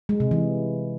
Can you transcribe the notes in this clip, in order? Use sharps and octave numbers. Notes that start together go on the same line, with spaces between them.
G#3
C3
E3